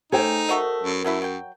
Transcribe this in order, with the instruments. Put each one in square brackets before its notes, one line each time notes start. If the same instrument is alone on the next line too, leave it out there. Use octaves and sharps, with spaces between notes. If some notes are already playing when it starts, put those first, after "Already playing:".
[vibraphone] A3 [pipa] C#4 G#5 [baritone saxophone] D#4 [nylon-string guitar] A4 C5 G5
[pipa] A3 F#4 D#5 [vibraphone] A#4
[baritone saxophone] F#2
[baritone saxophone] F#2 [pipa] F#3 A3 E4
[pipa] F#3 G5